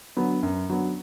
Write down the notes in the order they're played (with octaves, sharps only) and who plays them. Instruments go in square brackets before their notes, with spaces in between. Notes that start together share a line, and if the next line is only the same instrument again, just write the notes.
[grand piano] D3 F#3 B3
F#2
D3 F#3 B3